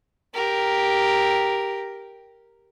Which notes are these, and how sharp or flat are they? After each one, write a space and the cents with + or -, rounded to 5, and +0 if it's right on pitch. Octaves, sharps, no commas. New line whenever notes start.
G4 +0 A#4 +0